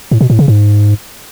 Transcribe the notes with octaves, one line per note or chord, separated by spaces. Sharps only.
A2
B2
A2
C#3
G#2